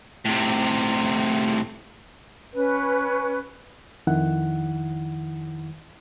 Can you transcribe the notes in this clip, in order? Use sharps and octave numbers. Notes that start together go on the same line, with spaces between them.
A2 C3
C#4 B4
F2 D#3 E4 F#5